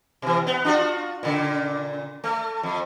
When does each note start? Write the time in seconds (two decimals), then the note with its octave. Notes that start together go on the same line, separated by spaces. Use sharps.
0.22 B2 E3
0.47 B3
0.65 D4 F4 F#4
1.23 A#2 C#3
2.24 A3
2.63 F2